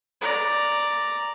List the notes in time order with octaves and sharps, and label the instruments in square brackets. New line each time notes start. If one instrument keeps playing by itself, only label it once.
[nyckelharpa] D5 A#5